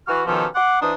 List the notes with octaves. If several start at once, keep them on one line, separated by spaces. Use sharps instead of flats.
E3 F#4 F6
B2 D#3 F3 C#4 G4 A4
F#5 C6 D6
E3 D4 D#4 C5 D#6